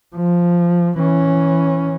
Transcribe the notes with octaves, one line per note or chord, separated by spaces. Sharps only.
F3
E3 C#4